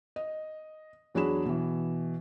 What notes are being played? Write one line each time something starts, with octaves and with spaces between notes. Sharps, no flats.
D#5
E2 F#3 D4 G#4 B5 E7
B2 E3